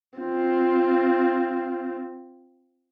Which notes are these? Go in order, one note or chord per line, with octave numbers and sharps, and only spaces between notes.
C4 F4